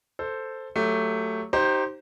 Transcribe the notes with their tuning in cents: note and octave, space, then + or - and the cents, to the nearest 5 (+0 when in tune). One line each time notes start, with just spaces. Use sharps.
A4 +5 C5 +0
F#3 +0 A3 +10 G4 +0
D#4 +0 G4 -25 C5 +10